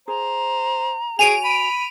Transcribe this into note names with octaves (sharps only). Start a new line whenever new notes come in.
G#4 C5 A#5
F#4 G#4 C#5 G#5 D7 D#7 F7
B5